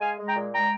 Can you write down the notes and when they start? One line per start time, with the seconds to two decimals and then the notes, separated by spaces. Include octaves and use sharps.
0.01 G#3 F5 G#5
0.18 G#3
0.27 G5 A#5
0.35 A#2
0.53 G#3 G5 A#5